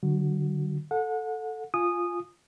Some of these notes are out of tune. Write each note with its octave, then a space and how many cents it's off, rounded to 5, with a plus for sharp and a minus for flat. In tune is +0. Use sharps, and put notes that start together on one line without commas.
D3 +20 F#3 +45 F#4 +0
A4 +0 F#5 -30
F4 +0 G#5 +0 D#6 -15